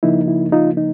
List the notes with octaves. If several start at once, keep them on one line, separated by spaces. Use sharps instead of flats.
C#3 F3 A#3 D#4 E4
E4
D#4 F4
D#4